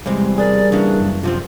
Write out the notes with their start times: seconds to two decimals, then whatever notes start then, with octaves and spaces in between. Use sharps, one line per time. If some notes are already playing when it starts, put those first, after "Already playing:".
0.06 E2 C3 G3 G#3 C4
0.38 G#4 A#4 D5
0.72 C#3 E3 A#3 D4
1.00 F#2
1.23 C3 F3 C4 F4